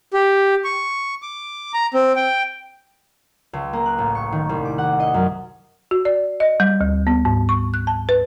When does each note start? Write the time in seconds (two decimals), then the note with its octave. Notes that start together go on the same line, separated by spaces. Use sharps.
0.14 G4
0.64 C#6
1.22 D6
1.74 A#5
1.94 C4
2.16 G5
3.53 C#2
3.73 A#3
3.86 F#6
3.98 A1
4.15 C#6
4.32 D#3
4.49 C2
4.65 D6
4.78 F#5
5.00 D#5
5.14 F#2
5.91 F#4
6.05 D5
6.40 D#5
6.60 G3
6.81 D2
7.07 B3
7.25 G#2
7.49 C#6
7.74 F#6
7.87 A5
8.09 B4